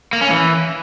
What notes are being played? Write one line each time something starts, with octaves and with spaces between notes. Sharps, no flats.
A#3
C#4
E3